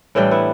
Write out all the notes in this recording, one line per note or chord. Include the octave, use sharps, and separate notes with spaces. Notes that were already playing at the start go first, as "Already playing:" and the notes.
A2 E3 G3 D4 G4
B3 E4